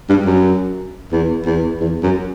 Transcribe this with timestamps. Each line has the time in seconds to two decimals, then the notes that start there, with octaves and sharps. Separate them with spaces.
0.09 G2
0.26 F#2
1.12 E2
1.46 E2
1.80 E2
2.03 F#2